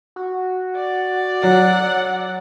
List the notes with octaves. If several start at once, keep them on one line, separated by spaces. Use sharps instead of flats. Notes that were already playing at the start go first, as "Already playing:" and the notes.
F#4
D5
F#3 F#5